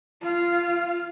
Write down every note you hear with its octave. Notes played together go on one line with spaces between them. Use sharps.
F4 F5